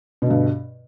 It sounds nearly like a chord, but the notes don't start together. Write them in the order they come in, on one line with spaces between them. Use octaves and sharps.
B2 D3 G2